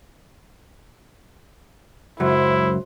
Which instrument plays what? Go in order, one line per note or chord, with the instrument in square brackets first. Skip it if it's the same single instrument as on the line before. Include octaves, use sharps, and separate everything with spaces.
[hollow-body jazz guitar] C#2 F#2 F#3 [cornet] E4 [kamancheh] C5